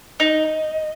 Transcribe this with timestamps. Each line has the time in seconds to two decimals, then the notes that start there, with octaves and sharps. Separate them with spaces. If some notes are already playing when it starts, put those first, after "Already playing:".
0.19 D#4 D#5